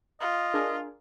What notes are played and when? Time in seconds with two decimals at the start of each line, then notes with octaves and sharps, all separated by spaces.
0.21 F4 D#5
0.54 D4 G#4 A#4